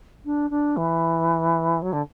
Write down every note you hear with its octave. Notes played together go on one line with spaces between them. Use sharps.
D4
D4
E3
F#3
D3